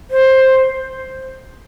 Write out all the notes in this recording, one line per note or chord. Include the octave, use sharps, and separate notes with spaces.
C5